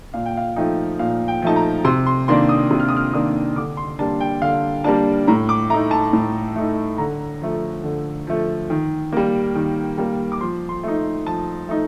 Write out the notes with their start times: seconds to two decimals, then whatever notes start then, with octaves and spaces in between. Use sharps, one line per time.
0.14 A#2 F5
0.26 G5
0.37 F5
0.56 F3 A3 D#4 G5
0.99 A#2 F5
1.28 G5
1.42 F3 A3 D#4 A5
1.56 A#5
1.85 C3 C6
2.07 C6
2.28 D#3 A#3 D4 C6
2.49 D#6
2.71 C3
2.80 F6
2.88 D#6
2.97 F6
3.13 D#3 A#3 D4 D#6
3.56 D3 D6
3.77 C6
3.99 G3 A#3 D4 A5
4.20 G5
4.42 D3 F5
4.84 G3 A#3 D4 A5
5.27 A2 A#5
5.49 D6
5.70 A3 A#5
5.74 D#4
5.91 A5
6.13 A2
6.56 A3 D#4
6.98 D3 A#5
7.41 F3 A3
7.84 D3
8.27 F3 A3
8.70 D#3
9.13 G3 A#3
9.55 D#3
9.98 G3 A#3
10.32 D6
10.41 F3 C6
10.69 C6
10.84 A3 D#4
11.26 F3 A5
11.69 A3 D#4